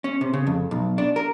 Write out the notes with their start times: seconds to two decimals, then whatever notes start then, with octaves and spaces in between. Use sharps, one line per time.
0.04 C#4
0.21 C3
0.34 C#3
0.47 F2
0.71 B1
0.98 D4
1.16 A#4